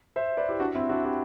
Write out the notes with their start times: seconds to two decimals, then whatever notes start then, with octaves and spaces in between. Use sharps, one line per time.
0.16 C5 E5
0.37 B4 D5
0.48 E4 G4
0.60 D4 F#4
0.75 C4 E4
0.89 D4 F#4
1.04 E4 G4